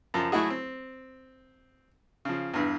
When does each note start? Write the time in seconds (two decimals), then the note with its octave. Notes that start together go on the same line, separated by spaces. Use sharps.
0.14 F#2 F3 A5
0.32 F#3 A3 E4 F#4 G#4
0.50 C4
2.25 C#3 F3
2.54 E2 G2